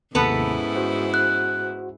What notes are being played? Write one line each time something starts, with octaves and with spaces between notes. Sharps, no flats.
D#2 G#2 C3 B3 C#4 E4 A4 B4
F#4 C5 F#5
F#6